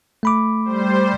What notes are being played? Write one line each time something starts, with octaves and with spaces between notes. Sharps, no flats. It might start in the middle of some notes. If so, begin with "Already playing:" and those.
A3 B5 D6
G3 C5